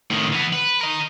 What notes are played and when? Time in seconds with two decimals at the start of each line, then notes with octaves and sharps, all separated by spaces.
0.10 A2 D#3
0.33 E3 B3
0.53 B4
0.81 A#4 D#5